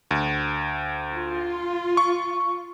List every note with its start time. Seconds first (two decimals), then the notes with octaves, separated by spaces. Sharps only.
0.11 D2
1.14 F4
1.97 C#6